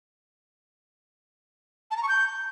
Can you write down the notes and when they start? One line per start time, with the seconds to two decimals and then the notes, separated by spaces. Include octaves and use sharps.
1.91 A5
1.97 A#5
2.03 C#6
2.09 G6